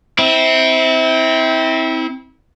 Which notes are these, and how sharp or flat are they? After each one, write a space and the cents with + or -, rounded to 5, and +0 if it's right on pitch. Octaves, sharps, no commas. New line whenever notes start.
C4 +0 E4 -30